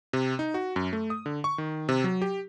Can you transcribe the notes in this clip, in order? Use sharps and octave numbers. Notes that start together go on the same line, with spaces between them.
C3
D#4
F#4
F#2
A3
D#6
D3
C#6
D#3
C3
F#3
G4